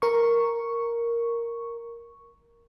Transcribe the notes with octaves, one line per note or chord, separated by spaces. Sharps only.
A#4 C#6